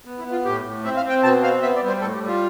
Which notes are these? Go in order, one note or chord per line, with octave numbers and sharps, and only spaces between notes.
B3
E4
B3
F4
A2 G4
A2
C4 E5
F5
C4
G5
B2 A5
C4 F5
B3 E5
D5
G3
C5
A2 A4
G4
G3
F4